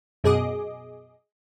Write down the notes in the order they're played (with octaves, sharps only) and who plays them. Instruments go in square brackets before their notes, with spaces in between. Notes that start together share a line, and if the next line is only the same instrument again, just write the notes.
[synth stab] F#2 B2 G#4 D#5 D6